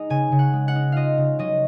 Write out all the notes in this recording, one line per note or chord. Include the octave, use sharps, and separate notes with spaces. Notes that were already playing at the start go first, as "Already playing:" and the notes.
Already playing: G#3 D#4
C#3 G#5
C#3
F#5
G#3
F#5
D#4
F4 D#5 F5
C#3
F#3 D#5